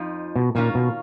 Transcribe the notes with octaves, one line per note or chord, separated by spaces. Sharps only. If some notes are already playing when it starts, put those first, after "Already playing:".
Already playing: F2 F3 D#4
B2
A#2 D#3 A#3 C#4 F4
B2